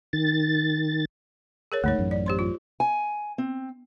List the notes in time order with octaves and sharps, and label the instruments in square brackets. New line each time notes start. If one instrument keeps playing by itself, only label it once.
[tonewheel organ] D#3 A6
[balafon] G#4 A#4 C#5
[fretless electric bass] D2 G#2 G#3 [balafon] A3 D#4 C#5
[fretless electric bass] A1 F#2
[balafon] D5
G4 C5 C6
F4
[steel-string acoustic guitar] G#5
C4